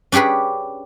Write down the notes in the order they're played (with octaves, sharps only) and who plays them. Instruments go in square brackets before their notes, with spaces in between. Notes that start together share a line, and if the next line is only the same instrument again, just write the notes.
[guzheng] C#4 D4 G4 G#4 B4